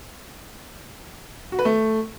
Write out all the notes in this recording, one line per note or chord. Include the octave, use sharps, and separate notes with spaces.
F#4
B4
A3